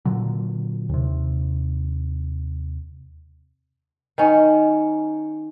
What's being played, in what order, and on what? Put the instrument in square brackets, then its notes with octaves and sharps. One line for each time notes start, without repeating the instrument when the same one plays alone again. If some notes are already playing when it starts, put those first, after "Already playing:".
[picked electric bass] A#2 D3 F#3
D#2 C3
[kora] D#3 C#4